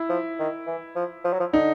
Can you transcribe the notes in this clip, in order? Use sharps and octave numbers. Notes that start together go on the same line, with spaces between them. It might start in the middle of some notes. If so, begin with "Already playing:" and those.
Already playing: E4
F3
D#3
E3
F3
F3
F#3
F3
D3 D#4